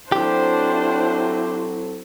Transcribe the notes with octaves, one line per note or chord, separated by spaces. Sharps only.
F#3 C4 D4 E4 G4 A4 C5